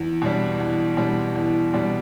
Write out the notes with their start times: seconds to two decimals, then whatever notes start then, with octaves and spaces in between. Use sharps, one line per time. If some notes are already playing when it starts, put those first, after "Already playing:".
Already playing: E2
0.22 B2 G3 D4
0.59 E2
0.97 B2 G3 D4
1.35 E2
1.74 B2 G3 D4